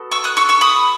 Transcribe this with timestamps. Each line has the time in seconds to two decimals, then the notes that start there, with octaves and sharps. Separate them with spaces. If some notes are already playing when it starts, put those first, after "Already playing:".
Already playing: B3 F#4 A4
0.11 C#6 E6
0.24 D#6 F#6
0.37 C#6 E6
0.49 C#6 E6
0.61 B5 D#6